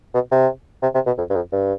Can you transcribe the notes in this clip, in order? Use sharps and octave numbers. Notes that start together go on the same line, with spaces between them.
B2
C3
C3
C3
B2
F2
G2
F2
G2